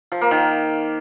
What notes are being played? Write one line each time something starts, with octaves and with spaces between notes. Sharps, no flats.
F3
A#3
D#3